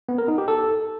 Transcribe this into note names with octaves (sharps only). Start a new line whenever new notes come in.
B3
A#4
D#4
G4
A4